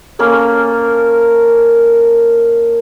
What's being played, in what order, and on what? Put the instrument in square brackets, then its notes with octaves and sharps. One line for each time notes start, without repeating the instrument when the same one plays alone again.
[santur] A#3 C#4 A4 A#4